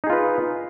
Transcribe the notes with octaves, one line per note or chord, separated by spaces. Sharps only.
D#4 F4 G#4 B4